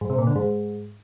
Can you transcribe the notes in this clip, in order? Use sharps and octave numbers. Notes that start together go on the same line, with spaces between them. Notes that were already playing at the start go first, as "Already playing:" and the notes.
G#2
C3
A#2
D3
G#2